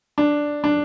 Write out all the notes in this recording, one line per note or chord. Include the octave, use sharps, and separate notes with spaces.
D4
D4